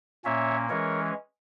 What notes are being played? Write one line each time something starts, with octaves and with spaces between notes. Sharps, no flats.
A#2 A#3 C#4 C#5 E5
E3 G#3 C#4 A#4 C#5